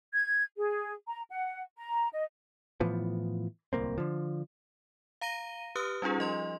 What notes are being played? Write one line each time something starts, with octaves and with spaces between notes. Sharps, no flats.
G#6
G#4
A#5
F#5
A#5
D#5
A2 E3 F3 B3
D1 C2 A#3 C4
D3 F3
F5 A#5 A#6 D#7 G7
G4 B4 D#6 F6 F#6
G3 C#4 D#4 F4 G#4
F3 D#5 C6